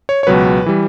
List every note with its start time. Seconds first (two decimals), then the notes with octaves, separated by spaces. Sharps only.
0.09 C#5
0.23 C#5
0.27 C#2 B2 F#3 B4
0.66 E3 G3